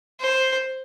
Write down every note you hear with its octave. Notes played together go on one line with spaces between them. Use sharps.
C5